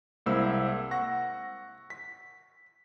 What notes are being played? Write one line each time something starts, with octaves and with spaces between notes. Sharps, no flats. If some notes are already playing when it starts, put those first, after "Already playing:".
C2 G#3 A#3 E4 C5 E6
F#5 C#6 A#6
B6